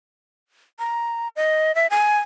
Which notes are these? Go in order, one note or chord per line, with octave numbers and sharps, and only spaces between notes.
A#5
D#5
E5
G#5